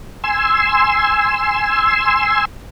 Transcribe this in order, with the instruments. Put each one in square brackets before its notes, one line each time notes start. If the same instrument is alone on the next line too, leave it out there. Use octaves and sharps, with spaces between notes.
[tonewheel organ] G#5 C6 E6